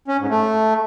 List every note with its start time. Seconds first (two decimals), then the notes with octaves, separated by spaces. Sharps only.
0.08 C#4
0.19 G#2
0.30 A3